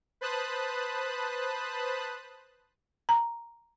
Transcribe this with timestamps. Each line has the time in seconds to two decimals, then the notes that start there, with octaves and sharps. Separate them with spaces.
0.21 B4 C5 A5 B5 D#6 F#6
3.09 A#5